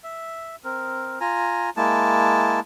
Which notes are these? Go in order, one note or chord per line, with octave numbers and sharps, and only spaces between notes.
E5
C4 A#4
F4 G#5 A#5
G#3 A#3 E4 A5